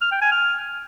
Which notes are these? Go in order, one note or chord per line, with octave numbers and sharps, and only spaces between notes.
F6
G5
G#5
F6